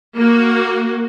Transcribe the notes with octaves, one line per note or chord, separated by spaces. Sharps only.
A#3 F#4